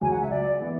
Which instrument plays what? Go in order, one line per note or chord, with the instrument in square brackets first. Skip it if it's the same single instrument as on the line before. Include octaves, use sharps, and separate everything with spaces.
[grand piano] C#2 C#3 F#3 C#4 [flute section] G#5
[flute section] F#5
E5
D5
[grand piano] E3 B3